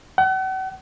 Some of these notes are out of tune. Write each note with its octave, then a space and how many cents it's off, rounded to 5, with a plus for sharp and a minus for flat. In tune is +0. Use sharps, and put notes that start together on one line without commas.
F#5 +40